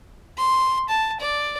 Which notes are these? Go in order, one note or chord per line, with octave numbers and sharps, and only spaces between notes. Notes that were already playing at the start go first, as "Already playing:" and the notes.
C6
A5
D5